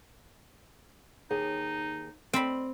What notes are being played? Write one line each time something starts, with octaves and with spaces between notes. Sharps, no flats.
D#2 D#4 G#4
C4 D5 D#5 B5